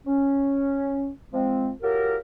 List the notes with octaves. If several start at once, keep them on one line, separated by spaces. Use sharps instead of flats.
C#4
F3 G#3 C4
F#3 F4 G4 A4 A#4